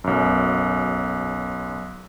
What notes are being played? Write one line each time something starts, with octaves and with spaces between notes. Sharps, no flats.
B1 F#2